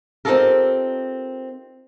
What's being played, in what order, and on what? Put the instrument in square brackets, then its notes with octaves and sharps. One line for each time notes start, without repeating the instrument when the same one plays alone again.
[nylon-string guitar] C4 D#4 F4 G4 A4 A#4